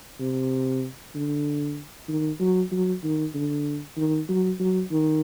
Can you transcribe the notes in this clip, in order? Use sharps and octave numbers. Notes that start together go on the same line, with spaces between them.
C3
D3
D#3
F#3
F#3
D#3
D3
D#3
F#3
F#3
D#3